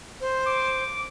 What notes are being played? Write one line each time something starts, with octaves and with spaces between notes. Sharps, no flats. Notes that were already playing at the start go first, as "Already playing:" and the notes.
C5
D6